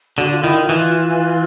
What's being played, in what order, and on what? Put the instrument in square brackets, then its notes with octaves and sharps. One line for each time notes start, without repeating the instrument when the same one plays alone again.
[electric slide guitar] D3 [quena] F#4
[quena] F4
[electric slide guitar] D#3 [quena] E4
[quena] F4
[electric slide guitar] E3 [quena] F4
[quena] F4